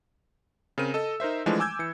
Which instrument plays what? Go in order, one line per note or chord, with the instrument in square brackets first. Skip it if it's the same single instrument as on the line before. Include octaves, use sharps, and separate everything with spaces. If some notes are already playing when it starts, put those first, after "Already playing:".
[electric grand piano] C#3 C4 A#4 D#7
A4 D#5 E6
D#4 A#4 C5 E5
E3 F3 G#3 A3 D4
G#5 D6 E6 G6 G#6
E3 C#7